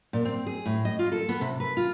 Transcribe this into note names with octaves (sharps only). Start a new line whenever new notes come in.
A#2
C4
G#4
A2
D#5
F4
A4
B3
C3
B4
F4